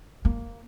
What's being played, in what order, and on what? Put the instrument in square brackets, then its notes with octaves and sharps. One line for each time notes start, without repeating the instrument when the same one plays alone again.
[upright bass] A#3